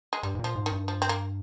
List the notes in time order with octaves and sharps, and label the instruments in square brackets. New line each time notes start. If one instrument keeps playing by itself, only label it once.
[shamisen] G#3
[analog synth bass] G2 [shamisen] G3
[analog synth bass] G#2
[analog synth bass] A#2 [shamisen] F3
[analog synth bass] G#2
[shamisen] D#3
[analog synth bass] G2
[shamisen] F3
C4
A#3